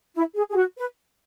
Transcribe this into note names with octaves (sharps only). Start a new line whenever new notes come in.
E4
G#4
G#4
F#4
B4